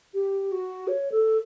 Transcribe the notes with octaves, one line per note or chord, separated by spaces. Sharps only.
G4
F#4
C#5
A4